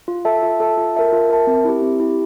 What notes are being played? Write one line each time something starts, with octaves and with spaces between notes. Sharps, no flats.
F4
A4 E5 A5
F4
A4 E5 A5
F4
A#4 E5 A5
F4
A#4 E5 A5
C4
E4 G4
C4
E4 G4